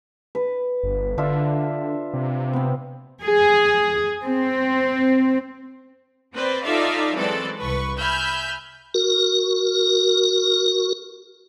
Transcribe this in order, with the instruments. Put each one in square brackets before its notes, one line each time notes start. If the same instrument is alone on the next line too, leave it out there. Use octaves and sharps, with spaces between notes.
[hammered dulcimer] B4
[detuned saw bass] G1
[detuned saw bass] D3 [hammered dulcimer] D4 F4 E5
[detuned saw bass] C3
[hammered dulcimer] B3 C4
[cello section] G#4
C4
[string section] C4 B4 C5 D5
D#4 F4 A4 D5 E5 F5
E3 F#3 G#3 C4 A4 D5
C2 B4 C#6
E5 G#5 B5 F6 G6
[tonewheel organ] F#4 A#4